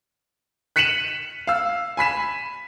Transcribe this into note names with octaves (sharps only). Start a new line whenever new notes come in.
F#6 B6 C#7 D#7 E7 F#7
F5 E6
G#5 B5 B6 E7